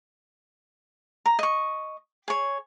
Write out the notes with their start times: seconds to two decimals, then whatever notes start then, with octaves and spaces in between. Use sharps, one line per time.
1.26 A#5
1.39 D#5 C#6
2.28 G#4 C#5